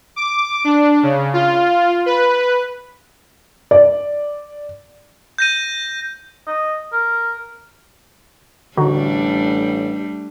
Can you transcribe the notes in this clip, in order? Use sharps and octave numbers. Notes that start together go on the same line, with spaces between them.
D6
D4
C#3
F4
B4
D5
G6 A#6 D#7
D#5
A#4
A1 D3 G3 A3 D4 D#4 F#4